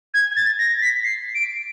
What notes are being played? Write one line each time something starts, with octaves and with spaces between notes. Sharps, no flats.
G#6
A6
A#6
B6
C7
D7